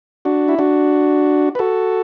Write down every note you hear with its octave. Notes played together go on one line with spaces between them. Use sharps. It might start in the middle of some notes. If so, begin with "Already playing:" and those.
D4 F#4
E4
D4 F#4
B4
F#4 A4